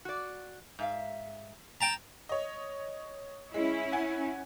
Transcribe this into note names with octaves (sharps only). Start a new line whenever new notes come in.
F#4 D5
G#2 E5 F5
G5 A5 A#5
C#5 D#5
G#3 C#4 E4
F#5 G#5